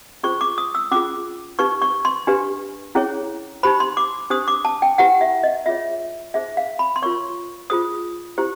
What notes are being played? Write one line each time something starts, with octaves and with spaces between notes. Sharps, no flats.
C#4 F4 G#4 C5 C#6
D6
D#6
E6
C#4 F4 G#4 D6
D#4 G4 B4 C#6
C#6
C6
D4 G4 B4
C#4 E4 G#4 C#5
D#4 G4 C5 B5
C6
D6
D4 G4 C5 D#6
D6
A5
G5
E4 G4 B4 F#5
E5
D#5
F4 G#4 C#5 E5
D#4 G#4 C5 E5
F5
B5
C6
F4 A#4 C#5 C#6
F4 G#4 C5 D#6
E4 G4 C5